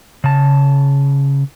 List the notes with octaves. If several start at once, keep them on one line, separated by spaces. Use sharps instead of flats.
C#3 A5